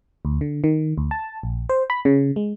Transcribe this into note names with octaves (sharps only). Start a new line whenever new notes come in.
D2
D3
D#3
D2
A5
A#1
C5
B5
C#3
G#3